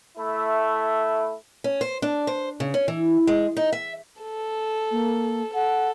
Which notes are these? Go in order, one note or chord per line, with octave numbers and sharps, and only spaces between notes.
A3 E4
C#4
C5
D4
C5
C#3
C#4
E3
G#3
D#4
E5
A4
A#3
A4 F#5